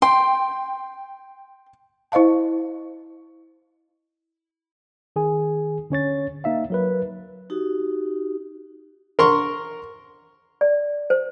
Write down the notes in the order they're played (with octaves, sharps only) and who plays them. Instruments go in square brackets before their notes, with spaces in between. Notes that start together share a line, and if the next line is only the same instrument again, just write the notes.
[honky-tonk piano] G5 [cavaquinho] C6
[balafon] E4 C5 D#5 F5 A5
[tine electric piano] D#3 G#4 G#5
D3 C#4 C#5 A6
A#3 D#4 E5 F5
F#3 A#4 B4
[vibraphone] D#4 F#4 G4
[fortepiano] A#4 C6 C#6
[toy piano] D5
C5